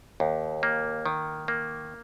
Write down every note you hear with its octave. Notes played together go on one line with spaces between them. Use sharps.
D#2
A#3
D#3
A#3